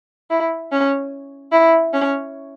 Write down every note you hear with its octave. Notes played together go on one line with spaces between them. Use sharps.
E4
C#4
E4
C#4